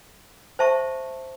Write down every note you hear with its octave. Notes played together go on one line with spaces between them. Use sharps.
C5 E5 A5 C#6